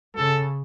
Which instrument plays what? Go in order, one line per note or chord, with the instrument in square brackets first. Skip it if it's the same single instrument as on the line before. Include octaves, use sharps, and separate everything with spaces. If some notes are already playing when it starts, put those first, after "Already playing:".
[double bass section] C#3 [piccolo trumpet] A4